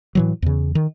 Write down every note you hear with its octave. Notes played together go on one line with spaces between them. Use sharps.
A2 E3 F#3
E2 C#3
D#3